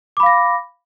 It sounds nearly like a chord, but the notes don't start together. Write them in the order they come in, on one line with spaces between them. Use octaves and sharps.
D6 B5 F5 A#6